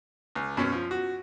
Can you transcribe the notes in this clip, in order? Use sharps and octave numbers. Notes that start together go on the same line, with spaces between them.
C#2
F#2 B2 C#4
F3
F#4